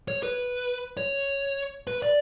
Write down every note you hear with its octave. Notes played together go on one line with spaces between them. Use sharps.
C#5
B4
C#5
B4
D5